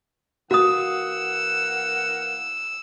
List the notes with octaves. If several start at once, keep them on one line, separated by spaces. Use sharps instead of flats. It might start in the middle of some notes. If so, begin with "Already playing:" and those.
E3 A#3 F#4 F#5 D#6 E6